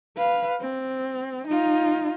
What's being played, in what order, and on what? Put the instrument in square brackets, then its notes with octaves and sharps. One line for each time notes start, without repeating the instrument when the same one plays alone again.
[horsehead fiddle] B4 F5
C4
D#4 F4